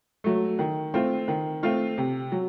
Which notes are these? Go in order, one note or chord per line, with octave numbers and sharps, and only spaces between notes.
F#3 A3
D#3
A3 C4 F4
D#3
A3 C4 F4
C3
F#3